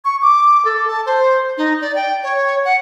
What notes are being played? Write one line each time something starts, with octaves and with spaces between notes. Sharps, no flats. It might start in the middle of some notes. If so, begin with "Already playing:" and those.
C#6
D6
A4
A5
C5
D#4
D5
G5
C#5
F#5